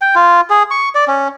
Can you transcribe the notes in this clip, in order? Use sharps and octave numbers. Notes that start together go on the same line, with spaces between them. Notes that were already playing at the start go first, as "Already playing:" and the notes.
G5
F4
G#4
C#6
D5
C#4